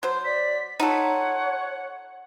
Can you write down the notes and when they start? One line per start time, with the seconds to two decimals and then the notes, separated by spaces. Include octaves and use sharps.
0.03 F#3 C5 C6
0.25 D5 B6
0.80 D#4 F4 A4 C#5 F#5